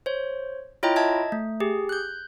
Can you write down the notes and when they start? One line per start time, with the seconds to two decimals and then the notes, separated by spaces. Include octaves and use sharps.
0.06 C5 C#5
0.83 E4 F4 C#5 D#5 G5 A#5
0.96 D#5 E5 A5 G#6
1.32 A3
1.60 G4 G#4
1.89 F#6 G6